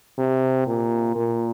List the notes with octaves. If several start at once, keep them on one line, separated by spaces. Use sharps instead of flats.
C3
A#2
A#2